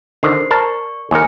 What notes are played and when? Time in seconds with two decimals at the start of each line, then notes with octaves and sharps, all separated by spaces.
0.23 D3 D#3 C5 C7
0.51 A#4 D5 A5 A#5 C#6
1.11 D#2 A#4 G#5 A#5 C#7